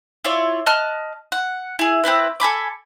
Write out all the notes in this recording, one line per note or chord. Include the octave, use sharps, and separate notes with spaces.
E4 F4 C#5 D5
D#5 A5 F6 F#6
F#5
E4 G#4
C4 D4 E4 B4
A4 G#5 B5 D6